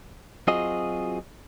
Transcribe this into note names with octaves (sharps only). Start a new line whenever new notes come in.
F#3 C4 F4 F#4 G#4 D#5